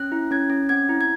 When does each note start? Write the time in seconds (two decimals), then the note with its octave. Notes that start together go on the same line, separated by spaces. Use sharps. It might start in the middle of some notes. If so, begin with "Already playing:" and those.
Already playing: C#4 F#6
0.12 E4
0.31 C#4 G#6
0.50 C#4
0.69 C4 G#6
0.89 E4
1.01 G#6